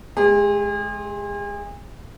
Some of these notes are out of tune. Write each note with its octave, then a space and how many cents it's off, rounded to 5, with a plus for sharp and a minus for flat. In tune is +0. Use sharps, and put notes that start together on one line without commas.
G#3 +30 G#4 -40